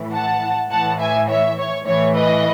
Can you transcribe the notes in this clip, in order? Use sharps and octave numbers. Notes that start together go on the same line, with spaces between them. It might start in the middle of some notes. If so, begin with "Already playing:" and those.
Already playing: A2 E3
F#5 A5
A2 E3 F#5 A5
E5 G#5
C#5 E5
C#5
A2 E3 C#5
B4 D#5